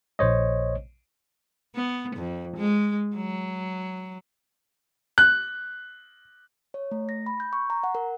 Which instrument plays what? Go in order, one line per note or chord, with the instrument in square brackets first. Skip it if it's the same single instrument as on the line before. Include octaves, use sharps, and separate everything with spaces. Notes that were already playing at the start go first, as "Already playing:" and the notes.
[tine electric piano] A#1 C5 C#5 D#5
[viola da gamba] B3
F2
G#3
F#3
[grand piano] F#6
[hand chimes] C#5
A3
A#6
B5
G6
C#6
A#5
F#5
A#4